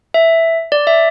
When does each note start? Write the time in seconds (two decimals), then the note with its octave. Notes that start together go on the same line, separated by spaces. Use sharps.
0.14 E5
0.72 D5
0.87 E5